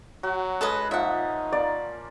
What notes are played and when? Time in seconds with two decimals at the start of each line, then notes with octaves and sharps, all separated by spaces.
0.23 F#3 F#4
0.61 G#3 C#4 A4 B4 D#5
0.91 A#2 F3 D#4 E5 F#5
1.52 A#3 D5